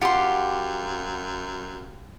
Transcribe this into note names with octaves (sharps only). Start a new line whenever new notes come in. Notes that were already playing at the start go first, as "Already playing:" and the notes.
F#2 F4 G4 F#5 C6